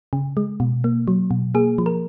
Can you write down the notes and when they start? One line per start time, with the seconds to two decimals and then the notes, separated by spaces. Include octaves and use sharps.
0.13 C#3
0.37 G#3
0.60 B2
0.84 A#3
1.08 F#3
1.31 B2
1.55 A#3 G#4
1.78 F3
1.86 A#4